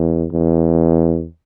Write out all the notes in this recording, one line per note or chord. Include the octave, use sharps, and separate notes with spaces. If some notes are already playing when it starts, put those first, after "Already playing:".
Already playing: E2
E2